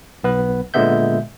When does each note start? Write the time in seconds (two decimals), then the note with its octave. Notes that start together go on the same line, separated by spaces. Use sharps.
0.24 B1 B3 B4
0.74 A#2 D3 G#3 B3 E5 G6